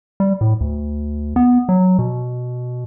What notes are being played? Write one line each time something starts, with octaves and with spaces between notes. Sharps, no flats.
G3
A2
D2
B3
F#3
B2